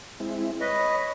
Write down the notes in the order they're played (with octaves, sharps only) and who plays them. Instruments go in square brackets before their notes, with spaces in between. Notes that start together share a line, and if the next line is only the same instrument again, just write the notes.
[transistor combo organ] G#3 C4 E4
[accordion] B4 D#5 [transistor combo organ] C#5